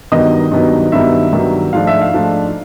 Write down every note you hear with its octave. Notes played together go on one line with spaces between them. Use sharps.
G2 D#3 F#3 B3 D#4 D#5
G2 D#3 F#3 B3 D#4
G2 D#3 F#3 B3 D#4 E5
G2 D#3 F#3 B3 D#4
G#2 F3 A3 D4 F5
E5
F5
G#2 F3 A3 D4